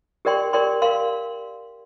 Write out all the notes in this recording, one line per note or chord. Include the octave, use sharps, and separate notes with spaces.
G4 A#4 D5 G5 C6
G4 A#4 D5 G5 C6
A#4 F5 C6